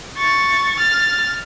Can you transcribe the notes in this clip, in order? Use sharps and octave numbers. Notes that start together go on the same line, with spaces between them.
C#6 A6
F6 A6